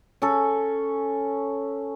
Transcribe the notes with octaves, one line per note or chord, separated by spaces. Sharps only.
C#4 A4